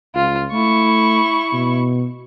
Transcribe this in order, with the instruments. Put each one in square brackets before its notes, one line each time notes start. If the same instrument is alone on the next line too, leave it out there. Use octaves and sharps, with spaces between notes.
[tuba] C#2 [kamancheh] F4
[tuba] A3 [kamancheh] E4 C#6
[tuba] B2